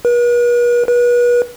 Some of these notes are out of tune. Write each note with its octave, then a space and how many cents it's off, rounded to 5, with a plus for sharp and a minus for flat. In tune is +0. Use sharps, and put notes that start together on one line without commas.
B4 -45
B4 -35